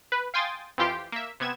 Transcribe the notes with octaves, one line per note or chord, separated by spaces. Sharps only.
B4
F5 G5 G#5 C6 D#6 A6
F2 E3 F4 G4 G5 C6
A#3 E5
C3 B3 G#6 E7